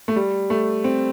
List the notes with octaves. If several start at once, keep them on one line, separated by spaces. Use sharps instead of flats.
A3
G3
A3
C4